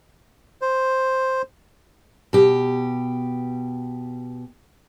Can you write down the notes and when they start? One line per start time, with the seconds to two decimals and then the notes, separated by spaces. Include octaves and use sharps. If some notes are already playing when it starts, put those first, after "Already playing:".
0.62 C5
2.33 B2 G4